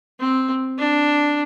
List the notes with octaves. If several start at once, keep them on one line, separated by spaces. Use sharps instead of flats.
C4
D4